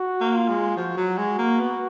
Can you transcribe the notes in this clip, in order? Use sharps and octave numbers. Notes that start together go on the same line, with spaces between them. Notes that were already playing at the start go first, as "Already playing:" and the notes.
Already playing: F#4
A#3
F4
G#3
F3 F#4
F#3
G#3
A#3
B3